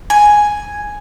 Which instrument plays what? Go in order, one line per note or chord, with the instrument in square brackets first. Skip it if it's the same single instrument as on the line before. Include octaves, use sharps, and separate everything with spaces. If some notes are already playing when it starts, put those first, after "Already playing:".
[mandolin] G#5